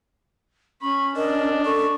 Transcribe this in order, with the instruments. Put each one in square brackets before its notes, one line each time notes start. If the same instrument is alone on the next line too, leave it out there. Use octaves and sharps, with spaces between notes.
[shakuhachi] C#4 [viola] B5 [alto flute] C#6
[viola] D4 [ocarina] A#4 [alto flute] D#5
[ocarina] A4 [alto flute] C#6